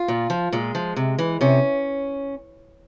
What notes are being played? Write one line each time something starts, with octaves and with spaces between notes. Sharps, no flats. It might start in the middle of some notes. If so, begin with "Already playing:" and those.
Already playing: F4
A#2
F3
A#2 G#3
F3
C3
E3
C3 C#4